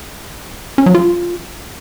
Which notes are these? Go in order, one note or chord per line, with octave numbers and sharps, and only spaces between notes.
C#4
F#3
F4